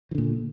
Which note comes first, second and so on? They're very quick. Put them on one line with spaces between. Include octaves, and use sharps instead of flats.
E3 D3 A#2